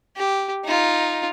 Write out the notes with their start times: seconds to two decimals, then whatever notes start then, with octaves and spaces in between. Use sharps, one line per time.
0.17 G4
0.64 D#4 F4